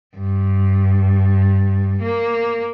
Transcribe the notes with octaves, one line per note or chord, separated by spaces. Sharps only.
G2
A#3